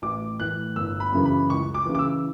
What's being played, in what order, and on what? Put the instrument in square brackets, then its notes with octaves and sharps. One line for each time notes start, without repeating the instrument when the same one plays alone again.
[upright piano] A1 D6
A2 E3 F#6
G1 E6
B5
F#2 C#3 E3
B5
C#2 C#6
D6
C#3 E3
D6
E6